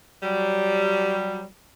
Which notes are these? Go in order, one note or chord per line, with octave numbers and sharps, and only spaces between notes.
F#3 G3